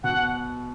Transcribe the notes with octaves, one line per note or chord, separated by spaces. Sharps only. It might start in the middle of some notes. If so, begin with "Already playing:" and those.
B2 F#5